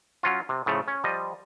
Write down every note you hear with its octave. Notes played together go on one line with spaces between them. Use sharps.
F#3 C#4 F4
C3
A2 C#3 F3 A3
C#4
F3 G3 D#5